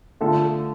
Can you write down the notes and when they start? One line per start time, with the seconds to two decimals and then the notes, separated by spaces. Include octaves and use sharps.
0.21 D3 A3 F4 A4